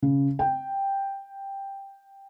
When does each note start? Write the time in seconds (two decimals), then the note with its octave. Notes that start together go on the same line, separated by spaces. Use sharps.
0.02 C#3
0.39 G5